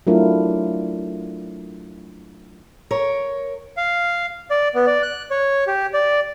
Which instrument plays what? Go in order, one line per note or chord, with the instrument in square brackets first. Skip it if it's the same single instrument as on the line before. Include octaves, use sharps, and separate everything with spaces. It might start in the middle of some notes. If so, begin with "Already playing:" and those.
[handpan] F#3 A3 D4 E4 F4 A#4
[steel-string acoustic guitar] A#4 C#5
[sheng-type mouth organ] F5
D5
B3
D5
F#6
C#5
G4
D5